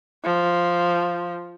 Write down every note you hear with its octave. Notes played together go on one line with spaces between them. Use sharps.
F3